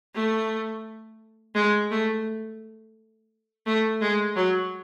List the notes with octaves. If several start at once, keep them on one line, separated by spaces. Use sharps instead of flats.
A3
G#3
A3
A3
G#3
F#3